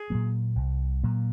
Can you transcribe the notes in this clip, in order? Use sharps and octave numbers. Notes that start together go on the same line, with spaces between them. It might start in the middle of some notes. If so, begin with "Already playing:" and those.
Already playing: G#4
A#2 F#3 A#3
C2
A#2 F#3 A#3